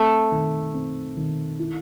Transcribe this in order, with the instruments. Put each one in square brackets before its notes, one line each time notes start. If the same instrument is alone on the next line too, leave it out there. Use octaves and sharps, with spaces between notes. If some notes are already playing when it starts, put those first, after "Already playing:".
Already playing: [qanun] A3 [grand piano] C4
[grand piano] D#3
C4
D#3
E4